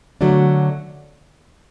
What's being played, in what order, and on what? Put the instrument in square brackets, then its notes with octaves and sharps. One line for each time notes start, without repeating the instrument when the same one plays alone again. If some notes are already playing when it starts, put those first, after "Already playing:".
[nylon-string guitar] D3 F#3 A3 D4